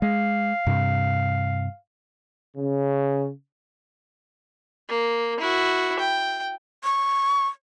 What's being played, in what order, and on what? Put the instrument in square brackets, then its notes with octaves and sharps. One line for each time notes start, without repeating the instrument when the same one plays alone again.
[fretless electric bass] G#3 [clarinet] F5
[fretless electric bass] G2 C3
[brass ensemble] C#3
[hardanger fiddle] A#3
E4 F#4
G5
[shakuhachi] C#6